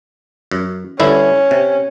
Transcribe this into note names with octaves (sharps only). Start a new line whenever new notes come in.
F#2
G2 D3 C#4 E4
C3